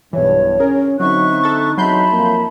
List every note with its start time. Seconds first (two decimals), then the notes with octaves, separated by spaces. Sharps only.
0.13 B1 G2 E3 C#5
0.60 C#4 G#4 A#4
1.00 D3 F#3 C4 D#4 E5 C#6 F#6
1.43 A4 A6
1.78 E2 F#3 D#4 E5 A5 B5 C6 G6
2.11 F2 A#3